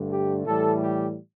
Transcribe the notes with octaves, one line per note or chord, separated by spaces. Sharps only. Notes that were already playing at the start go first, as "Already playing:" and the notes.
Already playing: G2 D3 A3
G4
A2 E3 G3 A4
G4